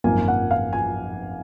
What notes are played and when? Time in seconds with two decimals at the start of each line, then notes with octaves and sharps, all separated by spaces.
0.04 G#1 F#2 F3 A#3 G#5
0.28 F#5
0.51 F5
0.73 G#5